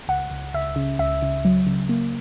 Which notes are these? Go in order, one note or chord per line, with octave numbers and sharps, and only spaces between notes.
C#2 F#5
C#2
C#2 E5
C#3
C#2 E5
C#3
F#3
C#3
A#3